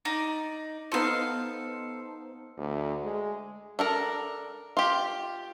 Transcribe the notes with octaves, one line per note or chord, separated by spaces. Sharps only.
D#4 D5
B3 D#4 A4 C5 F5
D2
G#3
D4 A4 A#4
F4 G4